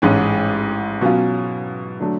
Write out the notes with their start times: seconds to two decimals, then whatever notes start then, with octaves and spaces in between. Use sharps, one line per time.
0.02 A1 G#2 G#3 C#4
1.01 B2 F#3 C#4 F4
2.00 D3 F#3 A3